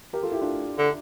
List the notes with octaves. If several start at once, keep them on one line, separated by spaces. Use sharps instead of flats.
G4 A#4
F4 A4
E4 G4
D4 F4
D3